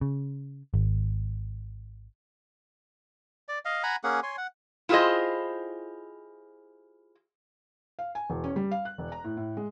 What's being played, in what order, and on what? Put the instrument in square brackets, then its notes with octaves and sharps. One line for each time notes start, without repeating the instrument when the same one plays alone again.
[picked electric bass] C#3
G#1
[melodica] D5
D#5 F5
F#5 G#5 A#5 B5
A#3 C#4 G#4 F#5
C#5 G#5 C6
F#5
[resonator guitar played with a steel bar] E4 F4 G4 G#4 C5 D#5
[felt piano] F5
G#5
E1
C#4
G3
F5
F#6
E1
A#5
A2
A2
G#3